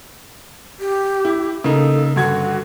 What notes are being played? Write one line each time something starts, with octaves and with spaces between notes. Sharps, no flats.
G4
E4
C#3 A#3 D#4 A4
G2 D3 F#4 G#6